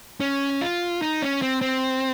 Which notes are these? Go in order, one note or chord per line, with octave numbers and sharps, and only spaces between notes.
C#4
F4
D#4
C#4
C4
C4